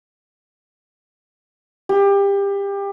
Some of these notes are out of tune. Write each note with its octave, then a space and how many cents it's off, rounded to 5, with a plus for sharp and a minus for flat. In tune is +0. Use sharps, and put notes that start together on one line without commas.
G4 +25